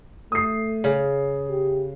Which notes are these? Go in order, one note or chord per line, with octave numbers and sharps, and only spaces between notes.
A3 D#6 C7
C#3
G4